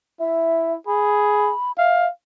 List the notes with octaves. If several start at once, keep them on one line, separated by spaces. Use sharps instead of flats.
E4 E5
G#4 B5
E5 F5